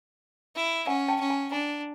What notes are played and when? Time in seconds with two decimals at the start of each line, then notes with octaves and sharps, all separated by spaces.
0.55 E4
0.87 C#4 F#5 G#5
1.08 G5 A5
1.20 C#4
1.30 G#5 A#5
1.52 D4 G#5 A#5